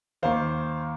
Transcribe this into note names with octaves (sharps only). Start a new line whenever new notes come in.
D#2 D#3 A#3 C5 F5